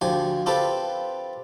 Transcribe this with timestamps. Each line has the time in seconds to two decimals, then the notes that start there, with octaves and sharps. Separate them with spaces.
0.01 D2 F3 G4 G#5
0.46 C4 F4 G4 A4 B4 A5